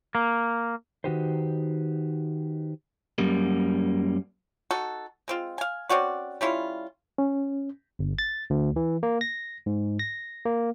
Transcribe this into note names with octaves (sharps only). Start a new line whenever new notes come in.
A#3
D#3 D#4 F#4 G4 B4 C5
F#2 G3 A#3
D#4 F#4 A4
G#3 C4 F4
F5 G#5
C4 C#4 F#4 D5
G3 C#4 E4 F4
C#4
G1
A6
D2
E3
A#3
A#6
G#2
A#6
A#3